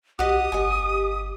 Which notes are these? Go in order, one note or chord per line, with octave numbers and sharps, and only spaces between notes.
B1 F#4 G4 D#5 D#6
G1 D#5 G#5